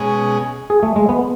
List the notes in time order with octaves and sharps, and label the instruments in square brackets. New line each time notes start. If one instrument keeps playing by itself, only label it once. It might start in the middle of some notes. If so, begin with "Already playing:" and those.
Already playing: [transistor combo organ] B2 G#3 C#4 G#4
[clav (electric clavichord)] G#4
A3
G#3
B3